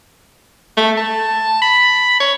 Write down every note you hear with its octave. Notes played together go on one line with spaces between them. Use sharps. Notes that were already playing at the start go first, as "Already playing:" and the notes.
A3
A5
B5
C#5